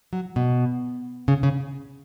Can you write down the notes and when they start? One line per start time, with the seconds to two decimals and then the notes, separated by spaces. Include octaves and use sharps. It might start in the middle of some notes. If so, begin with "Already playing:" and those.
0.13 F#3
0.36 B2
1.28 C#3
1.43 C#3